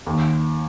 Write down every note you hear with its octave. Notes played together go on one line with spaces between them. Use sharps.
D#2